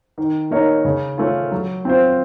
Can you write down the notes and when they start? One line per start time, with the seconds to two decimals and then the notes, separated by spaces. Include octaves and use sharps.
0.18 D#3
0.51 A#3 D#4 A#4 C#5
0.85 C#3
1.18 A3 C#4 F4
1.51 F#3
1.85 C4 F4 C5